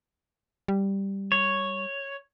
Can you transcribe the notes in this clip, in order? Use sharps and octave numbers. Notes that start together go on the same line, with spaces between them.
G3
C#5